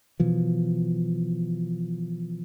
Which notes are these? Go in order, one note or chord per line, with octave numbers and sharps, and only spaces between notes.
B2 E3 F3